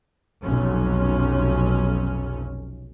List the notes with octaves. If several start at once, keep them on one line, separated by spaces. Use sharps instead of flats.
F1 B1 C#4